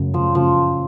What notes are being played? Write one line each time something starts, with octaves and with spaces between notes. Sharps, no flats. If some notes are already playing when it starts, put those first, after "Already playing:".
Already playing: F#2 C#3
C#3 F3
C#3 F3